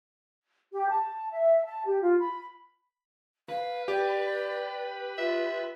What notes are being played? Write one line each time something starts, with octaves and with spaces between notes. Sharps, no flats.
G4
A5
E5
A5
G4
F4
B5
B4 F5
G4 D5
F4 E5